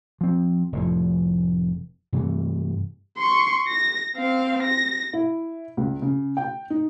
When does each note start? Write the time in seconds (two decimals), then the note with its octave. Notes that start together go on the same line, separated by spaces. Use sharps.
0.21 F3 C4
0.72 F1 A2 F3
2.13 G2 C3 E3 A3
3.18 C6 C#6
3.68 A#6
4.17 C4 F5
4.63 A#6
5.13 E4
5.77 C#2
6.02 C#3
6.37 G5
6.70 D#4